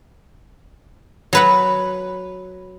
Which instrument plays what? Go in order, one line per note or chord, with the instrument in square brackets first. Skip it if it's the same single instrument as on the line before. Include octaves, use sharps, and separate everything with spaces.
[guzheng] F#3 B4 F#5